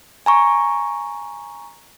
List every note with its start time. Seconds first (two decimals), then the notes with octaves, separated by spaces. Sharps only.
0.26 G#5 A#5 C#6